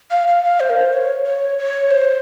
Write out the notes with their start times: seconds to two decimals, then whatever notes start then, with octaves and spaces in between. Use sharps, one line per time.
0.11 F5
0.27 F5
0.44 F5
0.60 C5
0.70 A#4
0.76 C5
0.93 C#5
1.26 C#5
1.58 C#5
1.90 C5